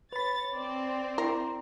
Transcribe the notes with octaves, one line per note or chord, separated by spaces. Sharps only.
B4 C#5 B5 A6
C4 D5
E4 A#4 A#5 C6